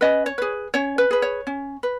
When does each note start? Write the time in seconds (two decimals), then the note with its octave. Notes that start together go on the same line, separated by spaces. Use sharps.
0.01 C#4 B4 D#5
0.26 C#5
0.38 G#4 B4
0.74 C#4 C#5
0.98 B4
1.11 G#4 B4
1.22 C#5
1.47 C#4
1.83 B4